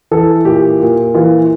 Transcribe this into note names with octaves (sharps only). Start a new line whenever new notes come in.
E3 A4
A#2 G4
A#2
E3 F4